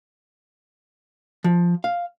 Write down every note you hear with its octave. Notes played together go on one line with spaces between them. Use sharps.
F3
F5